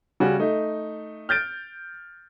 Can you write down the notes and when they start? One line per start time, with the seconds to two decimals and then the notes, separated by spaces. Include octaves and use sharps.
0.20 C#3 G3 C#4 F#4
0.39 A3 D#4
1.29 F6 G6 A6 D7